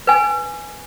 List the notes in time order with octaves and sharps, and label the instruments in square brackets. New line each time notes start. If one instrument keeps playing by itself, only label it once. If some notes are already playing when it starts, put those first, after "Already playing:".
[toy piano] B4 G#5